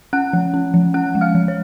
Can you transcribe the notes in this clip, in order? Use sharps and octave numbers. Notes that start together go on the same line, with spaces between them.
C#4 F#5 F#6
F3
C#4
F3
C#4 F#5 F#6
G#3
F5 F6
F3
C#5